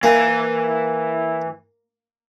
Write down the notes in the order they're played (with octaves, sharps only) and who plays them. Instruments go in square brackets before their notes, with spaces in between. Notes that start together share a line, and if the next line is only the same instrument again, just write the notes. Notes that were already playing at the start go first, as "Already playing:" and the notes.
[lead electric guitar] E3 G#5 [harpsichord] A#3